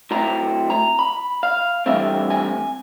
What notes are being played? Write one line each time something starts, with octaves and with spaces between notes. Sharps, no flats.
A2 F#3 A3 C4 A#5
A#5
B5
F5
G2 E3 A3 C4 E5
G#5